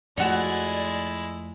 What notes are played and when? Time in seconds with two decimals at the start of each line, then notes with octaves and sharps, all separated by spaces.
0.17 F2 F3 G#3 A3 E4 F#4 C#5 D5